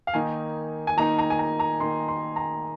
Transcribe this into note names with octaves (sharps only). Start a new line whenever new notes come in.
F5
D#3 A#3 D#4 G#5
G#5
D#3 A#3 D#4 A#5
A#5
G#5
A#5
A#5
D#3 A#3 D#4 C6
C6
A#5